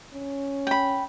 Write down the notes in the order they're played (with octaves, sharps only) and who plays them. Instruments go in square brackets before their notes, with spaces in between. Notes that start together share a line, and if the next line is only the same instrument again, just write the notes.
[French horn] C#4
[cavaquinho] G5 B5